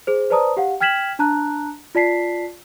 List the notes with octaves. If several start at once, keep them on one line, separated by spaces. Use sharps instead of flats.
G#4 C5
B4 C5 D5 A5 A#5 D#6
G4 F5 F#5
G5 F6 G#6 B6 E7 F#7
D4 A5 A#5 F#6
F4 D5 A5 B6 C7